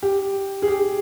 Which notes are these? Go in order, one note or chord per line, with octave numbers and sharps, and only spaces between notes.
G4
G#4
G4